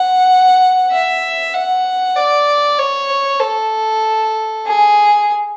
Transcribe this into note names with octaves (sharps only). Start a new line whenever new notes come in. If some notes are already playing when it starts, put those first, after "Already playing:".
Already playing: F#5
E5
F#5
D5
C#5
A4
G#4